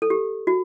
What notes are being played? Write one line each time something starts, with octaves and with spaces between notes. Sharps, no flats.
A4
G4
F#4